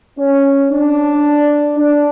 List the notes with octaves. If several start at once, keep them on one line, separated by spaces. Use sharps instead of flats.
C#4
D4
D4